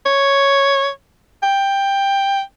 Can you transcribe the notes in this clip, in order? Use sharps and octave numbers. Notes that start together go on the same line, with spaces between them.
C#5
G5